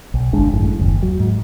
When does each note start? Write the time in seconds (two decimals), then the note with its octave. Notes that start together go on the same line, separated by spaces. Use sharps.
0.14 B1
0.33 G1 G#3 D4
0.52 G#1 F#2 A2
0.79 F#1 D#2
1.03 F#3
1.20 G#2